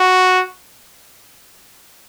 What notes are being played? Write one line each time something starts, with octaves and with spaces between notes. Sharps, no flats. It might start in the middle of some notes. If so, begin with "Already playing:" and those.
Already playing: F#4